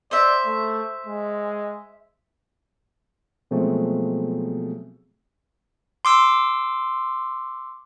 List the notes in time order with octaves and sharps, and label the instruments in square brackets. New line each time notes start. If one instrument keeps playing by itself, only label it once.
[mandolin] C5 E5 [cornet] D5
[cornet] A3
G#3
[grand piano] B2 F3 F#3 G#3 A3 C4
[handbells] C6 D6 E6